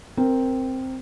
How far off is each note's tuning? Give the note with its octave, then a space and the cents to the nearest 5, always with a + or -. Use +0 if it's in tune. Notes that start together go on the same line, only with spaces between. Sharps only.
C4 +0 A#4 +0